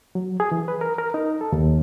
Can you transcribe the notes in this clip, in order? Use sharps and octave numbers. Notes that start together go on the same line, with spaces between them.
F#3
G#4
E3
B4
A#4
A#4
D#4
A4
D#2